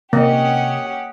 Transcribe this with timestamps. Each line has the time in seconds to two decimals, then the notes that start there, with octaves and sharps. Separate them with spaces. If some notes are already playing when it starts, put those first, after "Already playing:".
0.13 C3 A#3 C#4 G4 D#5 F#5